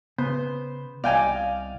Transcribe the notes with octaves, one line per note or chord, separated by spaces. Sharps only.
C#3 B3 C5
C2 D5 D#5 F5 G5 G#5